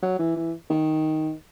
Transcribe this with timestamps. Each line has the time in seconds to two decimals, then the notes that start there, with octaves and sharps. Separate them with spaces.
0.02 F#3
0.19 E3
0.36 E3
0.70 D#3